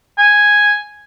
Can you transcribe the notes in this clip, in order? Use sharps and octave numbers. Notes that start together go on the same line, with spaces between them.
G#5